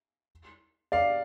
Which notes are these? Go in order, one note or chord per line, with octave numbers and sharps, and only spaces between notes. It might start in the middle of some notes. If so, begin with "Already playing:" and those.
D5 F5